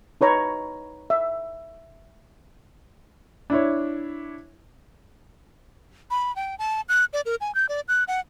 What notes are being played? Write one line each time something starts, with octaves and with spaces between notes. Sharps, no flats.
D#4 B4 C#5 A#5
E5
D4 E4 C#5
B5
G5
A5
F#6
D5
A#4
G#5
G6
D5
F#6
F#5